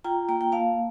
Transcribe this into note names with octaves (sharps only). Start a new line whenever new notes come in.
F4 G5 A#5
A#3 G5 A#5
G5
A#3 F5 A5